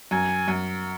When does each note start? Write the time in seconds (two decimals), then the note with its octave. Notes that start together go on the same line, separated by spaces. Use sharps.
0.11 F#2 G#5
0.48 F#2